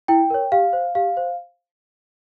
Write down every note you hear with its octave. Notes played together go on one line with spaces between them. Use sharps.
E4 G5
A#4 C#5
G4 F5
C5
G4 F5
C5